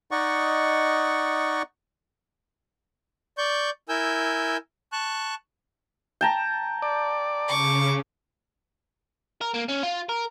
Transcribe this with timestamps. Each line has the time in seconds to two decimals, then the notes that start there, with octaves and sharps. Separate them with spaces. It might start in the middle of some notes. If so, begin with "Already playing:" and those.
0.11 D#4 D5 D#5 F#5 C#6
3.38 D5 C#6 G6
3.89 E4 A#4 G#5 E6 G6
4.92 A5 C#6 F#6
6.21 G5 A5 A#5
6.82 D5
7.49 C#3 C#6 D6
9.41 A#4
9.54 A#3
9.69 C#4
9.83 F4
10.09 A#4